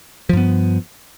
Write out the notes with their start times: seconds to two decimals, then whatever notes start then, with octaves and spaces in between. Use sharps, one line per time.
0.29 F3
0.33 G2
0.37 B3